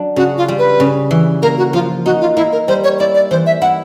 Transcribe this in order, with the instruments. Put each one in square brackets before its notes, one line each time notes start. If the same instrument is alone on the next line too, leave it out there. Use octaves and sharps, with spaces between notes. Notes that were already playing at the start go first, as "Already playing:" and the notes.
Already playing: [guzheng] F#3 D4
[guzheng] C#3 [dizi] F#4
[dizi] F4
[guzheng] G3
[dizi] B4
[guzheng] C#3
E3
[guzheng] A#3 [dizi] A#4
[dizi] F#4
[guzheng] F3 [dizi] F4
[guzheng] D#4 [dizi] F#4
[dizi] F4
[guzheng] A#3 [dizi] E4
[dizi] A#4
[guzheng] G3 [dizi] C5
[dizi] C#5
[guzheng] E4 [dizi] D5
[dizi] D5
[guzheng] E3 [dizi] C5
[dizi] E5
[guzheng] E4 [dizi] F#5